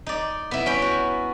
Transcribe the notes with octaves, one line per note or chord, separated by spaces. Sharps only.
D#4 D5
B3 E4
C#4 G5 B5
F#4